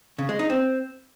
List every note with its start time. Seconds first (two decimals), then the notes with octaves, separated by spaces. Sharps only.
0.19 C#3
0.29 G#3
0.39 D#4
0.50 C4